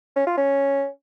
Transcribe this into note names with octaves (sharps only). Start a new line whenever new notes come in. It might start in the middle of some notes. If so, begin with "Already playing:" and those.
C#4
F4
C#4